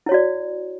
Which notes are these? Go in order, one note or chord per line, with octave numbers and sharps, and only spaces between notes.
E4 F#4 C#5 D5